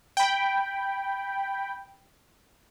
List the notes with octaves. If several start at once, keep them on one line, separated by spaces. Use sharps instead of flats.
G5 B5